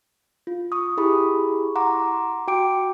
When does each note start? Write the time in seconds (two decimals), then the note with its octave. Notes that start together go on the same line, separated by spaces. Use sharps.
0.47 F4
0.72 C#6 D#6
0.97 E4 G4 G#4 B5 C#6
1.76 F#5 A#5 C6 D6
2.48 F#4 G5 D6 D7